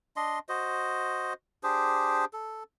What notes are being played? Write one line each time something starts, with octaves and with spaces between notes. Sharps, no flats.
D4 D#5 C6
F#4 C5 D#5
D4 G4 G#4 C5
A4